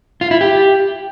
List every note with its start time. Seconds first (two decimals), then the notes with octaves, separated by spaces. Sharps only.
0.21 F4
0.31 E4
0.41 G4